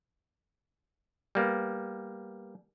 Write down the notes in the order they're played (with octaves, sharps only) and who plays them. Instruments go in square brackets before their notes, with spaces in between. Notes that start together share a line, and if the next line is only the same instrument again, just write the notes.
[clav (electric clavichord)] G3 A#3 B3